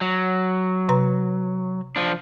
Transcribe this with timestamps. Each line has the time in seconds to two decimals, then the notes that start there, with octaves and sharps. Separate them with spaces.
0.01 F#3
0.89 C3 B4 A#5
1.96 F3 D4